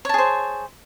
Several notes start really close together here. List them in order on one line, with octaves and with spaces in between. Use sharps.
C#5 A5 G#4 C5